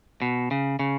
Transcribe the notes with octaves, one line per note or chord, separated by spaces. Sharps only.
B2
C#3
C#3